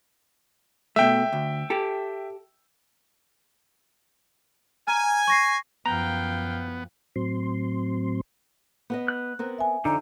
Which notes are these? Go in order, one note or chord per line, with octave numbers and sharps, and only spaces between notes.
B2 A3 E5 G5
D2
G4 A4
G#5 A#5 F6
C#6 A#6 C7
F#2 F3 B3 F5 G5 A#5
A2 F#3 C4 C6
B3 B4 D#5
F#6
B3 C4 A#4
E5 G#5
F2 D3 D#4 A#5